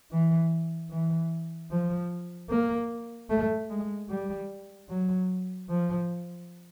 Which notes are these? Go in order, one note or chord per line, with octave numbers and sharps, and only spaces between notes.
E3
E3
F3
A#3
A3
G#3
G3
F#3
F3